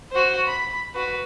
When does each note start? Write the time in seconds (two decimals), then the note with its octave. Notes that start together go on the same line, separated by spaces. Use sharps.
0.12 F#4 C5
0.46 B5
0.94 F#4 B4